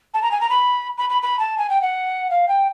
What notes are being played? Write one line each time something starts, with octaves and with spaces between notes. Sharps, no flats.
A5
A#5
G#5
A#5
B5
B5
B5
B5
A5
G#5
G5
F#5
F5
G5